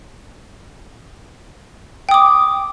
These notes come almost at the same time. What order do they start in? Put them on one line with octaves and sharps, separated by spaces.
G5 D#6 D6